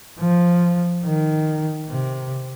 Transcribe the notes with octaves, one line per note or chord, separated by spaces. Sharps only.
F3
D#3
C3